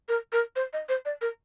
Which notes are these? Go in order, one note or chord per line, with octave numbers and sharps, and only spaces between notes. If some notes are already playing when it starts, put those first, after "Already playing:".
A#4
A#4
C5
D#5
C5
D5
A#4